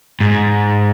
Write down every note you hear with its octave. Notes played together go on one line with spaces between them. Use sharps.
G#2